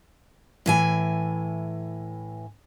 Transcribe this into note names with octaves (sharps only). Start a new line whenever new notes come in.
A2 E3 G#5